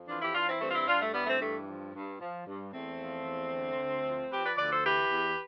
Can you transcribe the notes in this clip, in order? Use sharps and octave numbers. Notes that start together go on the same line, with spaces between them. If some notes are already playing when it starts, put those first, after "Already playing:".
Already playing: F2
E3 D4 F4
E4 G4
E3 D4 F4
C4 E4
G2 A3 C4
F4
C4 E4
G2 D4 F4
A3
E3 G3 B3
A3 C4
G2 A3
F3
G2
F3
G2
E2 A3 C4
F3
E2
D3
D2
F3
F3 G4 B4
B4 D5
D2 B4 D5
A4 C5
E3 G4 B4
E2